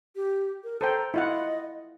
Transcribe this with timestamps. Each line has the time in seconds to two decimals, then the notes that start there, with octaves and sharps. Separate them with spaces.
0.16 G4
0.64 A#4
0.81 A4 C5 G5 A#5
1.14 E4 F4 D#5 F#5